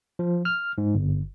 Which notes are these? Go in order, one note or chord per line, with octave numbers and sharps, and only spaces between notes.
F3
F6
G#2
G1